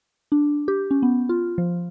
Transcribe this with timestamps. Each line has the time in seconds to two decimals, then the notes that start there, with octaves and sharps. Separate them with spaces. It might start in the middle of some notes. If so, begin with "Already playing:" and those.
0.32 D4
0.68 G4
0.91 C#4
1.03 B3
1.29 F4
1.58 F3